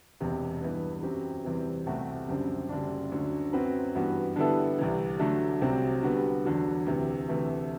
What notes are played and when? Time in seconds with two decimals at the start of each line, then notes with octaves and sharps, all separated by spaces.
0.20 E1 E2 C3
0.61 G2 E3 B3
1.03 F#2 F#3 C4 G4
1.45 E2 C3 E3 G3 C4
1.86 C2 B2 A3 C4 F#4
2.28 F#1 F#2 D3 G3 C4
2.69 F#1 F#2 D3 G3 D4
3.12 D2 D3 F#3
3.53 F#2 F#3 C4 F#4 B4
3.95 G2 E3 B3 F#4
4.36 D3 G3 B3 E4 A4
4.79 C2 C3 E3
5.19 D3 F#3 A3
5.61 C2 C3 F#3 C4
6.03 D3 G3 B3 F#4
6.45 E2 D3 F#3
6.86 D2 C3 E3
7.28 D2 C3 E3 A3